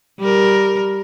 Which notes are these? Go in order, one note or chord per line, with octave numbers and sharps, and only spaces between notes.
G3 A#4